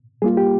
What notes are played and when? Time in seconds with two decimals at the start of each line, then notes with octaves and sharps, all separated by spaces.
0.22 G3 A#3 F4 G#4
0.37 G4